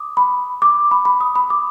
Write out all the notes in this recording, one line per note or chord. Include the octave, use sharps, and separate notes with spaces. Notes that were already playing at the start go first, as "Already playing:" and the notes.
Already playing: D6 D#6
B5
D6
B5
B5
D#6
B5
D6